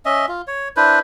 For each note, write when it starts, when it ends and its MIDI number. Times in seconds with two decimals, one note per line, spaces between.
0.05 0.26 61
0.05 0.26 75
0.05 0.26 76
0.28 0.42 65
0.47 0.68 73
0.77 0.99 62
0.77 0.99 64
0.77 0.99 71
0.77 0.99 72